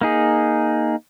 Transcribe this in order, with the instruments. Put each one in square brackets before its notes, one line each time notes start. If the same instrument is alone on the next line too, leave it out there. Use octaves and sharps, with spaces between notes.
[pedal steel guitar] A#3 D#4 G#4